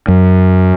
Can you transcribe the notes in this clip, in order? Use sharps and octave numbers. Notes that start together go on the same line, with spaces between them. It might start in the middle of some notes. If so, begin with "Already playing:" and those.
F#2